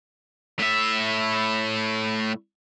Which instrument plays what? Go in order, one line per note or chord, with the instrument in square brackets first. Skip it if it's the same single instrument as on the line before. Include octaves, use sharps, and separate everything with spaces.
[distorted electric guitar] A2 E5